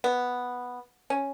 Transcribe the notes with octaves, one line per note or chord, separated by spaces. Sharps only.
B3
C#4